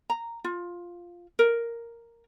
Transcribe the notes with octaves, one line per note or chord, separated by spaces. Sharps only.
A#5
F4
A#4